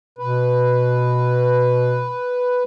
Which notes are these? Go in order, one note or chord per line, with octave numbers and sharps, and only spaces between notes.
B2 B4